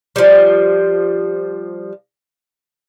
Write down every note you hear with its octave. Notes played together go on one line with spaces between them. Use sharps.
F3 G3